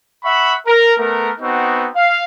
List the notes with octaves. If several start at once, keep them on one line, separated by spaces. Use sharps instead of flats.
E5 F#5 B5 C#6
A#4
A3 B3 A#4
B3 C4 D#4 F#4
F5